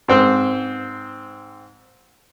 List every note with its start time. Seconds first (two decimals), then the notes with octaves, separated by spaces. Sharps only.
0.08 G#2 C4 C5